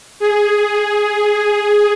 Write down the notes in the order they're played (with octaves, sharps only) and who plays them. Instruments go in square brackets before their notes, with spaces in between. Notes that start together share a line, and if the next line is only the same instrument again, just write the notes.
[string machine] G#4